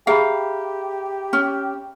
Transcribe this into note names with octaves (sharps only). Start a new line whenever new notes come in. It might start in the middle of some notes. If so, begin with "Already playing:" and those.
G4 G#4 E5 F5 A#5 B5
C#4